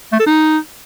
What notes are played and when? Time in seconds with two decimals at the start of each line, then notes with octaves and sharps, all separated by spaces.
0.13 A3
0.20 A4
0.27 D#4